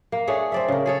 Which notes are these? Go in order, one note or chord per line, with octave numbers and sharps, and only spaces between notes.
A#3
A3 D4 G#4 C#5
C4 D5 E5
C#3 A#4
G#4 A4 C#5